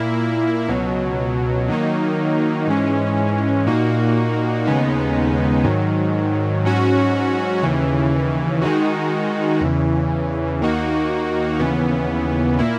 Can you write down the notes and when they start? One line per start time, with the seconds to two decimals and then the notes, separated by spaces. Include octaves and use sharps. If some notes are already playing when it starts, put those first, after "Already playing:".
Already playing: A#2 A#3 E4
0.68 C#2 B2 F#3
1.68 D#3 F#3 A#3 D#4
2.67 G#2 E3 G#3 C#4
3.66 A#2 A#3 D#4 F#4
4.65 D#2 C#3 G#3 B3 D#4
5.64 G#2 D#3 F#3
6.64 G#2 F#3 C#4 F#4
7.63 D#2 C#3 E3
8.62 D#3 G#3 D#4 F#4
9.61 E2 C#3 E3
10.61 D#2 D#3 A#3 D#4 F#4
11.59 D#2 C#3 E3 B3
12.59 A#2 A#3 E4